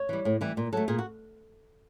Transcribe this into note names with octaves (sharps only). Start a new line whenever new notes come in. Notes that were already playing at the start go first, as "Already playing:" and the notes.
Already playing: C#5
E3 G3
A2
E3 G3
A#2
F#3 A3 A4
A#2 G#4
F#4